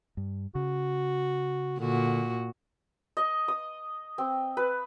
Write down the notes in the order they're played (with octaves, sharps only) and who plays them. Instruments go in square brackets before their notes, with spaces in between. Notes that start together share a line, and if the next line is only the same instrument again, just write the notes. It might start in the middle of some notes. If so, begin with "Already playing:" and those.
[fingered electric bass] G2
[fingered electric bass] C#3 [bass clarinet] F#4
[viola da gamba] A#2 F#4 [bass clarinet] D3
[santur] D#5
D#6
C4
B4